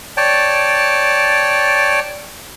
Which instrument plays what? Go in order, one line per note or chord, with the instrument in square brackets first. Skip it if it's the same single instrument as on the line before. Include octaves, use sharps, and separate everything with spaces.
[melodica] C#5 D5 G5 A5